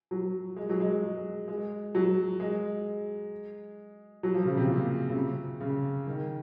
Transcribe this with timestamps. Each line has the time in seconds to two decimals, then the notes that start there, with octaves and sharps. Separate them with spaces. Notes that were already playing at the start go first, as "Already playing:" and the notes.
0.11 F#3
0.56 G#3
0.70 F#3
0.80 G#3
1.02 G#3
1.48 G#3
1.95 F#3
2.40 G#3
4.23 F#3
4.34 F3
4.45 C#3
4.57 C3
4.68 A#2
5.09 C#3
5.14 C3
5.60 C#3
6.07 D#3